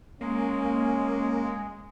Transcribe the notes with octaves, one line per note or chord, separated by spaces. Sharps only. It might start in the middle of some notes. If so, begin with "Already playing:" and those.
G#3 A#3 C#4